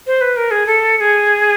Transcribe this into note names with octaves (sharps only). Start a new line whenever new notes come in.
C5
B4
A#4
G#4
A4
A4
G#4